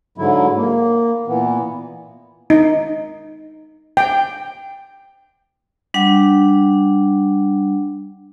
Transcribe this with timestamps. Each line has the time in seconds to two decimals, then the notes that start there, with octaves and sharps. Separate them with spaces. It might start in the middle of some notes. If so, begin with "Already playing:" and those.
0.18 G#2 D3 F#3 E4
0.57 A#3
1.28 A#2 E3 B3
2.50 D#4
3.97 G5
5.94 G3 D4 F#5